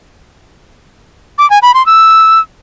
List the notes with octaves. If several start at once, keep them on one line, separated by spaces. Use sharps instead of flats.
D6
G#5
B5
C6
E6